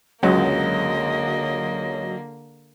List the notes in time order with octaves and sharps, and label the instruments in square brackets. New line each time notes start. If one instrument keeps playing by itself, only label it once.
[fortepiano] C#2 F#2 [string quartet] D3 A#3 [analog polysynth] F#3 [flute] D#5